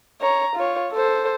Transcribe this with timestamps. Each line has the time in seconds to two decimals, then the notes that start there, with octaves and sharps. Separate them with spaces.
0.21 C#5 A#5
0.56 F4 C#5
0.92 A4 C5